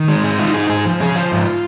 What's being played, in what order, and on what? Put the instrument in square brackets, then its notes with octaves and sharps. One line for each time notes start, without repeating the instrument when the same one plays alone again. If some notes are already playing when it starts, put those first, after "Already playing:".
Already playing: [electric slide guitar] D#3
G#3
G#2 G#4
D#4 F4
D#4 G#4
G#2 G#4
F3
C#4 G#4
F3 F4
G#2